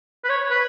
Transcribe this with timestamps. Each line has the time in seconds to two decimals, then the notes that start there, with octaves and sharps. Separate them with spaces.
0.24 B4
0.30 C#5
0.51 B4